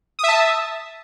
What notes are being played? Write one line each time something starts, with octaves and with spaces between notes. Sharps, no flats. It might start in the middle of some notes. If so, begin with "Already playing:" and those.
E5 A5 D#6